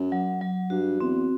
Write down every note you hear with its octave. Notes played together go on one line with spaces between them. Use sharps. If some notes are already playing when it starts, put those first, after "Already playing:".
Already playing: F#2
F#3
F#3
G2 F#4
E2 C4